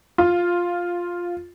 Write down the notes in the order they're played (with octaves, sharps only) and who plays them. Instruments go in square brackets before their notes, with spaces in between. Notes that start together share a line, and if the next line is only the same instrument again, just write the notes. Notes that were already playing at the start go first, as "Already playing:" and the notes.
[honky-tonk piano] F4